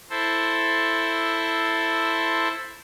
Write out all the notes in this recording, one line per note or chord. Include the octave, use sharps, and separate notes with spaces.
E4 A4 C5